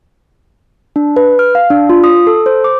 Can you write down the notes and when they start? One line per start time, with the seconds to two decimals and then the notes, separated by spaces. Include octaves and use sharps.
0.96 D4
1.16 B4
1.39 F6
1.55 F5
1.70 D4
1.89 F4
2.04 D#6
2.27 A4
2.46 C5
2.64 D6